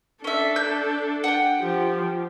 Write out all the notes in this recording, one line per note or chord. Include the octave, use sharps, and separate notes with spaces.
C#4 D4 A4 E5
G6
F#5 G5
F3 G4